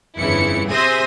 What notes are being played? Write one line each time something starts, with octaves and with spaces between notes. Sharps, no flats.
G1 F2 C#3 E3 E4 C#7
C3 G#4 C5 E5 D#6 A#6